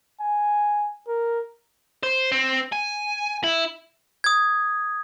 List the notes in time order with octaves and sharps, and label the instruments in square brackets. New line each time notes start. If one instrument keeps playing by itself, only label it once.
[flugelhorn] G#5
A#4
[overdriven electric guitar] C5
C4
G#5
E4
[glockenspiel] D#6 G#6